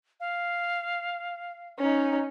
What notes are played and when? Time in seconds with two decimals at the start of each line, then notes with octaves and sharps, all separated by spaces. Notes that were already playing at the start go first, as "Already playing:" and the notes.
0.20 F5
1.79 C#4 D#4